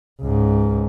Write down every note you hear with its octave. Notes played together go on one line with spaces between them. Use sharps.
C#2 G#2